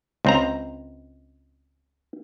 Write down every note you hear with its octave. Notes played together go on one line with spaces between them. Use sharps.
C#2 C4 A#5